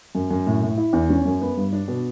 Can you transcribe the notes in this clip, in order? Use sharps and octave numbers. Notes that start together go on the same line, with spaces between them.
F#2
F#2
A2
A2
E4
E2
C#4
F#2
B3
G2
D4
B2